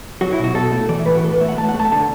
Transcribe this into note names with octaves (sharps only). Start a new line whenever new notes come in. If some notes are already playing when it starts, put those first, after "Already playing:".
F#3 F#4
E4
B2
F#4
B2 A4
A3
E3 D5
E5
A2 B4
F#4
A2 A4
B4
A3 E5
F#5
A3 A5
F#5
A3
A5
D3 A5